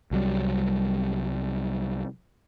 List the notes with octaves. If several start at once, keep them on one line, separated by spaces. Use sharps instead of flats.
C2 F#3 G3